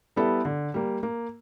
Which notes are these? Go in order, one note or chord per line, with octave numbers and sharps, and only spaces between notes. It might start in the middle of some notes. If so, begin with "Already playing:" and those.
G3 B3 E4 A4
D3
G3 A#3
A#3